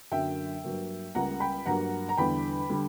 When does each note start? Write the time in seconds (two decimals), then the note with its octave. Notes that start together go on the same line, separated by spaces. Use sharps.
0.11 F#2 D3 F#3 A#3 E5 G5
0.64 G2 F#3 A#3
1.15 C#2 C#3 G3 A#3 F#5 A#5
1.40 G5 B5
1.66 G2 F#3 A#3 F#5 A#5
2.09 A#5
2.17 E2 D3 G3 G5 B5
2.70 D3 G3